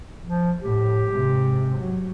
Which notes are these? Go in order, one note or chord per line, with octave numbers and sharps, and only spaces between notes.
F3
A2 G4
G#2 C3
F#3